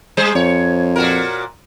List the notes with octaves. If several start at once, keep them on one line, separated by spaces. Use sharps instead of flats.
G3 G#4 C5
F2 C#5
A#2 F#4 A#4